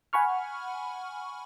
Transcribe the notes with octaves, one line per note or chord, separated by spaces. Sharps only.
F#5 G#5 B5 C#6 F6